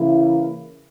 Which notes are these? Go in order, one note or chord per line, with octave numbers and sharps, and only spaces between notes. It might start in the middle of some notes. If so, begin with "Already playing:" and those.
Already playing: C#3 E3 A#3 E4